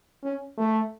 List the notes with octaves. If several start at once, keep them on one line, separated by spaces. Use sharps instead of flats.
C#4
A3